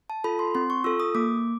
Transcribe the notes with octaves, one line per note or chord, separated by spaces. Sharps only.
A5
F4 A4 B5
C6
C4 C6
C#6
F4 A4 E6
D#6
A#3 D6